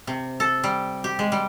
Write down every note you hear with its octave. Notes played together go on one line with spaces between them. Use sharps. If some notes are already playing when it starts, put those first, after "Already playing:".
C3
A4
G3
G4
G#3
G3